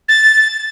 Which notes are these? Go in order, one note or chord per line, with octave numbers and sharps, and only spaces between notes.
A6